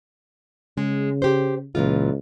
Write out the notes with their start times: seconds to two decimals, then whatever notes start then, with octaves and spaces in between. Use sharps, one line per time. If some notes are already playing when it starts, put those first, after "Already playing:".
0.77 C#3 G#3
1.22 G4 C5
1.75 C#2 A#2 E3 F4